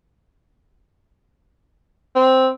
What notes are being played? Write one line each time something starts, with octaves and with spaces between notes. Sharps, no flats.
C4